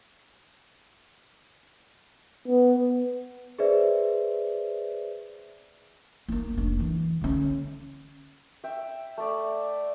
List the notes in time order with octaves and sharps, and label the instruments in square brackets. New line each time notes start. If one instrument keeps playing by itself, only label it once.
[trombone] B3
[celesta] G#4 B4 C5 D5 E5
[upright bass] A#3 B3
F1 D4
E3
D3 C#4
[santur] E5 G5
A3 D5